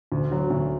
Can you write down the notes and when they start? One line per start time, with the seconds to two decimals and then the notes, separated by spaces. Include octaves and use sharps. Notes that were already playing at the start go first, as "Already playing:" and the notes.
0.12 D2
0.31 D3 F#3
0.50 D2